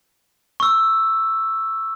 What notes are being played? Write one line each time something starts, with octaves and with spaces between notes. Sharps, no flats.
C#6 E6